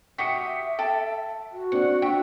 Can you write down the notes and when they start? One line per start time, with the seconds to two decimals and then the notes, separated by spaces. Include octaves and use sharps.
0.18 F#4 G4 E5 D#6 B6 C#7
0.79 A4 G5
1.52 F#4
1.72 C4 D4 D5 F#5 C#7
2.02 D4 E5 G5